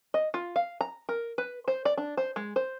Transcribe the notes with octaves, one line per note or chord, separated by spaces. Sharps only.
D#5
F4
F5
A#5
A#4
B4
C5
D5
D4
C5
G#3
C5